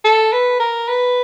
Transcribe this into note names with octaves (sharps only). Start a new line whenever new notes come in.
A4
B4
A#4
B4